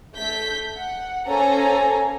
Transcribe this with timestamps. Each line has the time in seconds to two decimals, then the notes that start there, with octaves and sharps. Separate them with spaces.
0.15 A3 G6 B6
0.77 F#5
1.27 A#3 C#4 A4 C5 G#5 A#5